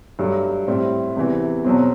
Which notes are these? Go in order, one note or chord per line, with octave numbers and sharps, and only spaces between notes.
G2 F#3 A3
A2 G3 C4 E4
E2 C3 E3
E2 B2 F#3 C4